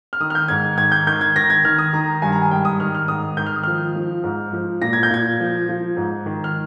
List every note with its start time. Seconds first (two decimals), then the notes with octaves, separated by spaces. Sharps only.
0.13 F6
0.20 D#3 D#6
0.30 F6
0.35 G6
0.48 G#2 G#6
0.78 D#3 G#6
0.92 G6
1.07 D#3 G6
1.21 G#6
1.36 D#3 A#6
1.50 G#6
1.64 D#3 F6
1.78 D#6
1.93 D#3 A#5
2.22 G2 G#5
2.32 A#5
2.42 G#5
2.50 G#2 G5
2.65 D#6
2.80 D#3 F6
2.95 F6
3.08 G#2 D#6
3.37 D#3 G6
3.46 F6
3.56 D#6
3.63 F3 F6
3.96 F3
4.24 G#2
4.53 F3
4.81 A#2 A#6
4.93 G#6
5.03 G6
5.10 A#2 G#6
5.40 F3
5.69 F3
5.97 G#2
6.26 D#3
6.44 F6